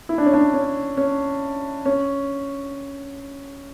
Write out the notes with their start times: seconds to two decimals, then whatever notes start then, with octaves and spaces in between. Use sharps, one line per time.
0.09 E4
0.18 D4
0.26 C#4
0.34 D4
0.54 C#4
0.97 C#4
1.85 C#4